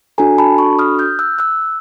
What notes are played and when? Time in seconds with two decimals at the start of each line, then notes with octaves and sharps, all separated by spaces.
0.18 D4 F#4 A4 G#5 A#5
0.38 A5 B5
0.58 B5 C#6
0.79 D#6 F6
0.99 F6 G6
1.19 E6 F#6
1.39 E6 F#6